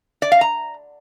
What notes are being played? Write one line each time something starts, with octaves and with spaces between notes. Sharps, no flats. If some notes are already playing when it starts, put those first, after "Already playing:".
D5
F5
A#5